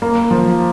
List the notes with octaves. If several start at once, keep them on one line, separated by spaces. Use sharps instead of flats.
A#3
F3